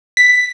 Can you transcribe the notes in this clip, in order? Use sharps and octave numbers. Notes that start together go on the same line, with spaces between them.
B6